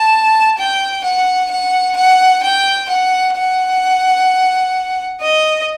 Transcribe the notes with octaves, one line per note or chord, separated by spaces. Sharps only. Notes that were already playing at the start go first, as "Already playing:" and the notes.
Already playing: A5
G5
F#5
F#5
F#5
G5
F#5
F#5
D#5